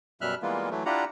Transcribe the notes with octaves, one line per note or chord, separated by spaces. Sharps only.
F#2 B2 G3 E5 F6 F#6
E3 G3 G#3 A#3 B3 F4
E3 F#3 A3
D4 E4 F4 G4 F#5 A#5